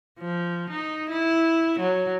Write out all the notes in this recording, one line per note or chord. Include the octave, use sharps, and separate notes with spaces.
F3
D#4
E4
F#3